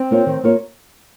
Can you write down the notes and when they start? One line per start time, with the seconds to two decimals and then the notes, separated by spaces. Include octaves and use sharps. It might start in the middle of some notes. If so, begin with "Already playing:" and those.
Already playing: C4
0.11 A#3 F4 A#4 C#5
0.27 D#3
0.43 A#3 F4 A#4 C#5